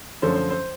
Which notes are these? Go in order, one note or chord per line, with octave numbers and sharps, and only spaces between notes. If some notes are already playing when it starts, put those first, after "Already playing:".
F#2 D3 F3 A3 C5
C5
C5